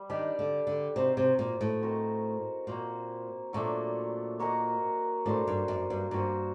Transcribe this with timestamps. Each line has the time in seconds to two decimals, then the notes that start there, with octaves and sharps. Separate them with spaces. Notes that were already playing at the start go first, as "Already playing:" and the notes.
Already playing: G3
0.09 D#3 D4 G4 D5
0.39 D3
0.67 D3
0.95 C3 D#4 F#4 C5
1.17 C3
1.39 A#2
1.61 A2
1.81 C4 F#4 A#4 D#5
2.67 A#2 A#3 F#4 C5
3.53 A#2 F#3 A3 D4
4.39 A#3 F#4 A#4 D#5
5.26 A2 D4 F#4 C5
5.47 G2
5.68 F#2
5.90 G2
6.11 G2 A#3 F#4 C5